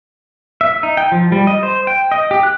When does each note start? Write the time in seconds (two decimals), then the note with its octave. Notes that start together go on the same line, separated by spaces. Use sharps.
0.61 E5
0.83 D#4
0.97 G5
1.12 F3
1.32 G3
1.47 D#5
1.63 C5
1.87 G5
2.12 D#5
2.31 G4
2.43 F#6